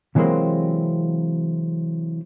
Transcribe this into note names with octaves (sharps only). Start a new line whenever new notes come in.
C3 E3 F#3 G#3 A#3 C4